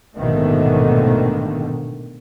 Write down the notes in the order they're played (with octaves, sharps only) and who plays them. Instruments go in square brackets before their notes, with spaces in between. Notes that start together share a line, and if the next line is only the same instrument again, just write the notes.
[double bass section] A#1 G#2 B2 D3 D#3 A3